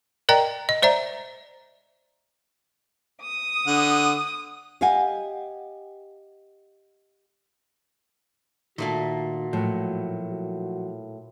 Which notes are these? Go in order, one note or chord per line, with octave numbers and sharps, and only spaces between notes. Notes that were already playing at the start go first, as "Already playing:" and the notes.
A#4 D5 D#5 G5 A#5
D#5
C5 D5 E5 A#5
D#6
D3 F#5
G4 D#5 F5 F#5 G#5
A#2 D#3 A3 A#3 D4 F#4
A2 F3 F#3
F#4